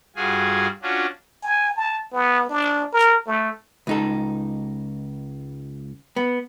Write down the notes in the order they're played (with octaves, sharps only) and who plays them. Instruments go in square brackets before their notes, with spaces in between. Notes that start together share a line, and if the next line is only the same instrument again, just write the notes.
[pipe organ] G2 F4 F#4 G#4 G#5
C#4 D4 F4 F#4
[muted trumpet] G#5
A5
B3
D4
A#4
A3
[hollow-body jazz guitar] C#2 D#4 A4
B3